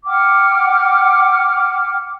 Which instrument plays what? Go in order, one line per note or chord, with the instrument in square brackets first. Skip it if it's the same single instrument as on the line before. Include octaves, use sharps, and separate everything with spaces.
[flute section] F#5 G5 D6 F6